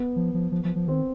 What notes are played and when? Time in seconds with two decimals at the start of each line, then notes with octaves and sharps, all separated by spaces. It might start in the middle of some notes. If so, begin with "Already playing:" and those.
Already playing: B3
0.16 F3
0.34 F3
0.52 F3
0.64 F3
0.76 F3
0.87 D#3 C4